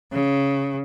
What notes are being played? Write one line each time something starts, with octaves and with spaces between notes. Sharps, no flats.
C#3